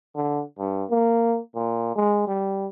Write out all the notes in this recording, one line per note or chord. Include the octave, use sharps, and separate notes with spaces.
D3
G2
A#3
A#2
G#3
G3